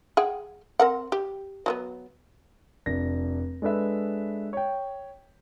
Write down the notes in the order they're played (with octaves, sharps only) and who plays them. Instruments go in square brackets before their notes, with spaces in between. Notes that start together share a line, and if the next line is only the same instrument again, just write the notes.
[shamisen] G#4 F#5 G5
C4 A#4 F#5
G4
F#3 G3 B3
[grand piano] F1 D4 A#6
G#3 D4 A4 B4 E5
C#5 G5